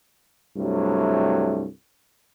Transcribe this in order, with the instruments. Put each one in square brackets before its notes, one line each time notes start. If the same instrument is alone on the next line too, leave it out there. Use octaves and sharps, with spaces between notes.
[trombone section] C2 G2 F#3 A3